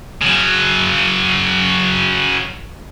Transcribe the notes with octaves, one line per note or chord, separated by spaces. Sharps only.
C#3 F#3